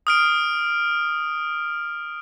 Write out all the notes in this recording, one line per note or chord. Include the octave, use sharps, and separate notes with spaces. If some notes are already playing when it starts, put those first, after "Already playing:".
D#6 F6 D7